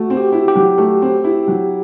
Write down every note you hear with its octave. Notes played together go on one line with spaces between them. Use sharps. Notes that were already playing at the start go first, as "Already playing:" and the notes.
Already playing: A3 F#4
C4
G4
E4
G4
F#3
A3
C4
E4
F#3